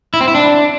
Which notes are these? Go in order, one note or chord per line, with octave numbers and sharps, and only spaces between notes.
E4
C4
E4
D4